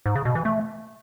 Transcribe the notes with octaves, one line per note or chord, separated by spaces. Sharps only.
G#2
C#3
B2
E3
A3